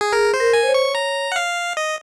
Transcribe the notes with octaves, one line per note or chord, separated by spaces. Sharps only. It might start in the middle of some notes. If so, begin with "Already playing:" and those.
G#4
G#4 A#4
C5
A#4
G#5
C5
C#5
C#6
A#5
F#5
F5
D#5